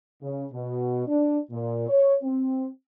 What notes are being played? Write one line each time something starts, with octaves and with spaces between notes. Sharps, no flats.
C#3
B2
D4
A#2
C#5
C4